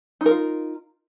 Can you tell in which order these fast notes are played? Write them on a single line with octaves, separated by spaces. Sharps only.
D#4 A#4 F4